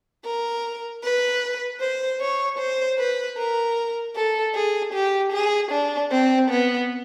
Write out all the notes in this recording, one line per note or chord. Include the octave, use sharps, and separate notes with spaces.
A#4
B4
C5
C#5
C5
B4
A#4
A4
G#4
G4
G#4
D4
C4
B3